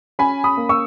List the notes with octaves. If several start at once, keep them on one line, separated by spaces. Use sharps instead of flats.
C#4 G#5 B5
B5 D#6
A#3
C#6 E6